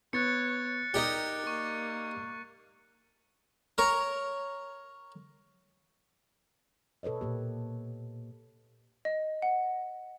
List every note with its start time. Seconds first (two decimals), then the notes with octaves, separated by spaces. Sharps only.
0.13 B3 C#5 F#6 A6 C#7
0.94 D#4 G4 A#4 D5
1.47 A#3 C#6
3.78 A#4 C#5
7.03 B2 A4 B4 C#5 D#5
7.21 A#2 A#3 G4
9.05 D#5
9.42 F#5